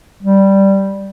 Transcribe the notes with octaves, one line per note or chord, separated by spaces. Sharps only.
G3